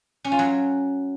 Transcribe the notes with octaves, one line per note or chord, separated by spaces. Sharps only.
C#4
F4
F#3